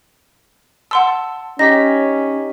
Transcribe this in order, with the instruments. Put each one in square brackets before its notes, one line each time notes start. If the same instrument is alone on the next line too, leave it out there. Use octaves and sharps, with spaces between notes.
[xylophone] F#5 C6 E6 [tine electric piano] A5
[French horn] C#4 [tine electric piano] D#4 G4 B6 [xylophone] A#6